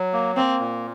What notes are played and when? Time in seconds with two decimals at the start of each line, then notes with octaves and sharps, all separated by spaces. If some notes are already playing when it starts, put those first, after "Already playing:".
Already playing: F#3
0.13 A#3
0.36 A#3 C4
0.60 A#2